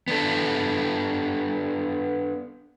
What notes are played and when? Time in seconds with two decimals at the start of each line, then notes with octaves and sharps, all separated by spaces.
0.08 B3 D4 A4